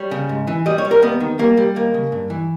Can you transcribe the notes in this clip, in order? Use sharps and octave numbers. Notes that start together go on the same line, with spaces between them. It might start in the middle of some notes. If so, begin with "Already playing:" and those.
Already playing: G3 C#5
C#3
G#2
E3
G3 D#5
C#5
G3
A#4
D#2 B3
D#3
G3 A#3
G3
D#2 A#3
C#3
G2
E3